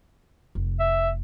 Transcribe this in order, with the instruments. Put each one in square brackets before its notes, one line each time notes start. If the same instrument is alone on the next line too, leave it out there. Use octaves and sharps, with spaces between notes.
[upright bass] F1
[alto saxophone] E5